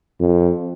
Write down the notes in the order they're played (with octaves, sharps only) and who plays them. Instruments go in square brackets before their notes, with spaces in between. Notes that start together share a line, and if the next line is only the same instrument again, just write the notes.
[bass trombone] F2